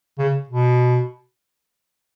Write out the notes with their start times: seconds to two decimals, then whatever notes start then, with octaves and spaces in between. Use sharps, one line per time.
0.18 C#3
0.49 B2